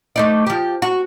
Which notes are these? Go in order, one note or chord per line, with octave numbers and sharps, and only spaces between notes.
A3 D#4 D5
F3 G4
F#4